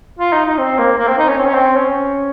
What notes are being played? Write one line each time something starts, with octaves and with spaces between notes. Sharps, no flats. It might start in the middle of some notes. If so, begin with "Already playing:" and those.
F4
D#4
D#4
C4
A#3
A#3
C4
D#4
C#4
C4
C#4
C4
C#4